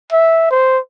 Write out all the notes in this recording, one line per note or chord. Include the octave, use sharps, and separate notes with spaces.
E5
C5